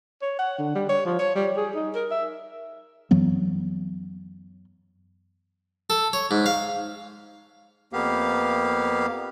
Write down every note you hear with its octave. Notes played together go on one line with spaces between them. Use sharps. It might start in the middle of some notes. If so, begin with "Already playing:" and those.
C#5
F#5
D3
G3
C#5
F3
C#5
G3
G#4
D#4
A#4
E5
F#2 E3 F#3 B3
A4
C#5
G#2
F5
F2 A#3 B3 G4 F5